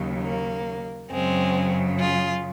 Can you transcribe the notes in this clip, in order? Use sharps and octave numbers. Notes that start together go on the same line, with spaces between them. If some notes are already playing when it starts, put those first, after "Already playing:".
Already playing: D#2 C#3 F#3
A#3
F#2 C#3 F#3 G#3 C4
F4 G#4